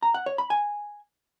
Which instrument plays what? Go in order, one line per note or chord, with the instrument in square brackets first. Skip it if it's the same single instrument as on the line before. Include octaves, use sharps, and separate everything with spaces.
[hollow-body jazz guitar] A#5
F#5
C#5
B5
G#5